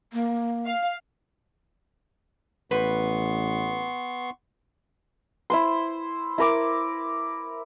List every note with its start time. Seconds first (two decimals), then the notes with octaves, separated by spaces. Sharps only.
0.13 A#3
0.66 F5
2.71 A1 B3 B4 C6 C#6
5.50 E4 C5 C6
6.38 E4 A#4 D6